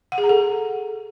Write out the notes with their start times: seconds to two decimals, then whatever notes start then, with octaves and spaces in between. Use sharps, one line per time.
0.12 F#5
0.18 G#4
0.24 A#5
0.29 A4